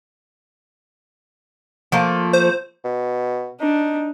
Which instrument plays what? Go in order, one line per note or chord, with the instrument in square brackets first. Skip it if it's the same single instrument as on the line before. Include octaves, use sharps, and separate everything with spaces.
[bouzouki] F3 A3 A#3
[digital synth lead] C5
[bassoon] B2
[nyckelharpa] D4 [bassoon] D#4